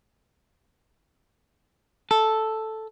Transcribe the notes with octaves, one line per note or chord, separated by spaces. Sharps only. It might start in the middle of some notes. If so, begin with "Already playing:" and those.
A4